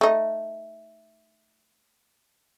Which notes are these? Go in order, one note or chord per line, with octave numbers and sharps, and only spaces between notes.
A3 D#4